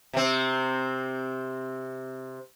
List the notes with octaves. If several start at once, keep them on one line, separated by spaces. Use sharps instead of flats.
C3 C4